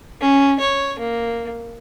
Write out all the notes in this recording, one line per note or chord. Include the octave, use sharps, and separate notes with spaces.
C#4
C#5
A#3